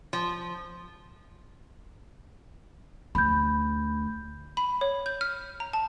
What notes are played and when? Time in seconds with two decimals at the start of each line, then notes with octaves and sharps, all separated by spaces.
0.13 F3
3.15 D2 B5 G6
4.57 B5
4.81 C#5
5.06 G6
5.21 F6
5.60 A#5
5.73 A5